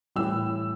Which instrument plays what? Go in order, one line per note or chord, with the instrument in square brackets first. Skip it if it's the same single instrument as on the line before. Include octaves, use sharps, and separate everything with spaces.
[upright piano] A2 E3 G3 E6